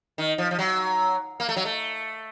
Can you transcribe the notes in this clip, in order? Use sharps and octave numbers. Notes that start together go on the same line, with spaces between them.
D#3
F3
F3
F#3
A#3
A3
F#3
A3